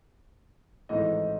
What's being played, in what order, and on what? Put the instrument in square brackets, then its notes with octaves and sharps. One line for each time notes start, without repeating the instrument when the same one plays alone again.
[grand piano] G#1 G#2 E3 A3 D#4 D#5